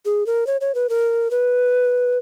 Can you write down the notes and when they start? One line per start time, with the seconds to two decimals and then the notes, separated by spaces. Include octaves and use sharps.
0.05 G#4
0.26 A#4
0.47 C#5
0.61 C#5
0.75 B4
0.89 A#4
1.31 B4